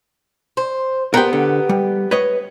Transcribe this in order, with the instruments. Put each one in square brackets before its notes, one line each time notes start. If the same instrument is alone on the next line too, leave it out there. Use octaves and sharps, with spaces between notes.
[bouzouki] C5
[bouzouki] B3 G4 [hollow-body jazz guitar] A#4 C5 G5
[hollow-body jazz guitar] D3
G3
B4 C#5 D#5